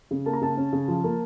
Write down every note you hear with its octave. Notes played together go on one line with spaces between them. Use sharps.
C#3
A#3 A5
A#5
C#3 A5
C#4
C#3
F3
A#3